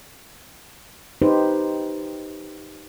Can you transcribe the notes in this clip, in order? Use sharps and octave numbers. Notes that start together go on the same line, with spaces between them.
D#4 G4 B4 C5